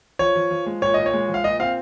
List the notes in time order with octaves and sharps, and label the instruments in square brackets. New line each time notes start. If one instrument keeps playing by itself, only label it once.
[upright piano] F3 [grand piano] C#5
[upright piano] F3
F3
G#3
[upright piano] A#2 [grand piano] C#5
[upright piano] A#2 [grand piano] D#5
[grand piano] C#5
[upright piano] G#3
F3
[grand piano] F5
[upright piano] A#2 [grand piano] D#5
[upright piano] C4 [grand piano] F5